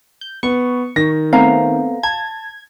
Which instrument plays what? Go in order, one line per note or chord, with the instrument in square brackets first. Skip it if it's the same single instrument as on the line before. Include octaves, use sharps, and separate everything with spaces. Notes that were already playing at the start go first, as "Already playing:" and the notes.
[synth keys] G6
[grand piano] B3 [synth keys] C#6
[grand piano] D#3 A#6
[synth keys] A3 B3 C4 [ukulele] F5 A#5
[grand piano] A5 [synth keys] G#6